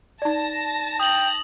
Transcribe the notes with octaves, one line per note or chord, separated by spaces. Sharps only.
D#4 D5 A5 A#6
G5 D#6 F#7